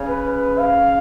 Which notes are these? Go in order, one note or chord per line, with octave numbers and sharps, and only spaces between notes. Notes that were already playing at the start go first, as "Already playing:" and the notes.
Already playing: C#3
B4
F5